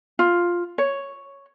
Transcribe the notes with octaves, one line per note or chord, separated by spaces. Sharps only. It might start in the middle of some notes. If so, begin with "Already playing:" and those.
F4
C#5